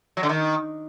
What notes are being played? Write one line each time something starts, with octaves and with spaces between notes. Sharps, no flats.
F#3
D3
D#3